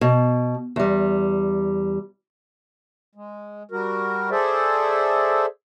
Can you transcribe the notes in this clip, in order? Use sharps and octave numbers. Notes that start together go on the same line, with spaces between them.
B2
E2 G3
G#3
G3 F#4 A#4
G#4 A4 C5 D5 E5